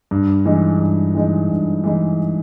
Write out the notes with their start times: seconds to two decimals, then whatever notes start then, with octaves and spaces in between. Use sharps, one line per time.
0.11 G2
0.46 E3 G#3 D#4
0.81 G2
1.15 E3 G#3 D#4
1.49 G2
1.84 E3 G#3 D#4